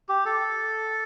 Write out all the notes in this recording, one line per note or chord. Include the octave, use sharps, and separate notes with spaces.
G4
A4